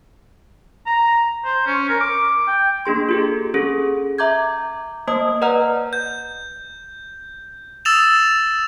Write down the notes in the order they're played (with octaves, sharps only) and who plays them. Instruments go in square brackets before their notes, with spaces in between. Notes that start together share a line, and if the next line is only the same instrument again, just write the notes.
[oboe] A#5
C5
C#4
A#4
D6
G5
[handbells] A#3 D4 G#4 C6
F4 G4 A4
C#4 G#4 A4
E5 A#5 D6 G6 G#6
A#3 C5 D#5 A5 D#6
B4 D5 D#5 F#5 A#5 F6
[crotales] G6
D#6 E6 A6 E7 F7